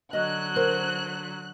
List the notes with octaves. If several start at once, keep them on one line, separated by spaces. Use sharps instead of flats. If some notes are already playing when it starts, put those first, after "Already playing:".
D3 F#3 F#4 D#5 F#6
A#4 C5